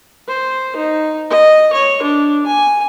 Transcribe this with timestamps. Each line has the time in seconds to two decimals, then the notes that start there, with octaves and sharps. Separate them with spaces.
0.28 C5
0.77 D#4
1.31 D#5
1.73 C#5
2.03 D4
2.46 G#5